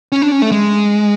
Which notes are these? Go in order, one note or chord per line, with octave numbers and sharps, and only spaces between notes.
C#4
D4
C#4
A3
G#3